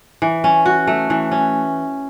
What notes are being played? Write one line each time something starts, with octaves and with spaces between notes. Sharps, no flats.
E3
C#4
F#4
A3
E3
C#4